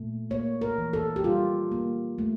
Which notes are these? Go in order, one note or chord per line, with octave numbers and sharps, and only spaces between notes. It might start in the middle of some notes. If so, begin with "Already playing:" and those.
Already playing: A#2 A3
A#3 C#5
A#4
E3
A4
G4
G3 F4
A#3
A3